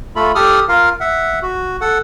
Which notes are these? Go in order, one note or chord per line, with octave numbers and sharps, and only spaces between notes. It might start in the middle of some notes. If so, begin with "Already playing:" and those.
A3 F4 A4 B5
G4 A4 D#6 F6
F4 A#4 F5
E5 F#5
F#4
A4 F#5